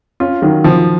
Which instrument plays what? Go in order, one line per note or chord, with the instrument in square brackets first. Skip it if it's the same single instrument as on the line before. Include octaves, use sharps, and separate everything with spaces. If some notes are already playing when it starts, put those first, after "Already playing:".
[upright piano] C#4 F4
D#3 F#3
F3